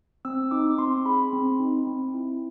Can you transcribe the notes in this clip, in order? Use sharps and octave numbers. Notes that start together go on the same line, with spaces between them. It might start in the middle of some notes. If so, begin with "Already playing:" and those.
C4 E6
D#4 D6
C4 C6
G#4 B5
C4
D#4
C4
E4